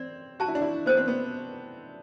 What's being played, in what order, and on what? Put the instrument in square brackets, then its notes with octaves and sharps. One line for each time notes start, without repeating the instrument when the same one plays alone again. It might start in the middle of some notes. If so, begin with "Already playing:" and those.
Already playing: [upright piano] C4 [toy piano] D5
[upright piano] F#4 [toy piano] A5
[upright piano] E4
D4
E4
[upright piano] B3 [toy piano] C5
[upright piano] C4
B3